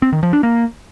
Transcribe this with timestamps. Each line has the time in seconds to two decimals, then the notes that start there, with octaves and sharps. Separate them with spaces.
0.02 C4
0.12 D#3
0.23 F3
0.33 D4
0.43 A#3